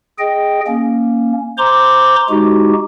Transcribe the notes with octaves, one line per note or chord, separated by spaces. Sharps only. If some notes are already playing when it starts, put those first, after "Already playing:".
G#4 D#5 G5
A#3 C#4
C5 A#5 C6 D6
G#3 D#4 F#4 G4